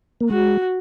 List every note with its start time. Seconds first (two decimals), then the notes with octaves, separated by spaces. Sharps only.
0.21 A#3
0.30 G#3 F#4